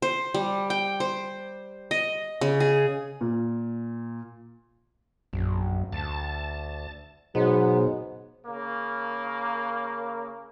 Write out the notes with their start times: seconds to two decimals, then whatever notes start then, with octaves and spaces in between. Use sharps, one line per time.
0.02 C5
0.34 G3
0.70 G5
1.00 C5
1.91 D#5
2.41 C#3
2.60 G#4
3.21 A#2
5.33 A#1 F#2
5.93 D2 A5
7.35 G#2 B2 F#3 B3
8.46 C#3 A#3